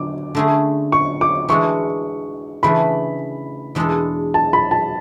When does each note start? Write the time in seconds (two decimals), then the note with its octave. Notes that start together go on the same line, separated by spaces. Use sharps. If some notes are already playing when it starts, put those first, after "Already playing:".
Already playing: D3 F#3 D6
0.35 D3 A3 C#4 G#4
0.92 C#6
1.21 D6
1.49 E3 G#3 D4 F#4 C#6
2.63 C#3 E3 A3 D4 B5
3.75 E2 B2 G#3 D4 A4
4.34 A5
4.53 B5
4.71 A5